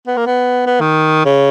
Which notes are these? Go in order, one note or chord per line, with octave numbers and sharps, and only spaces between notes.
B3
A#3
B3
B3
D#3
C#3